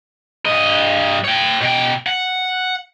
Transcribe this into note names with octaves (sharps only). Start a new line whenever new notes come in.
G2 D#5
C#5 G5
B2 G5
F#5